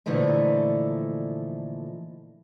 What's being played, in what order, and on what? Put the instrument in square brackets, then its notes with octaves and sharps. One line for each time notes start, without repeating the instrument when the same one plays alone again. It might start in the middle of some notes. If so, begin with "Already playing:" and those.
[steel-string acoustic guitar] A#2 D3 E3 F3 A3 D#4